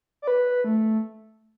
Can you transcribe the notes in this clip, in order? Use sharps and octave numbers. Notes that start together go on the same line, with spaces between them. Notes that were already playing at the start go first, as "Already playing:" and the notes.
D5
B4
A3